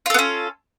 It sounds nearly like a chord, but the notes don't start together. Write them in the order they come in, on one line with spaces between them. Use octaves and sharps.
F4 A4 B3 C#4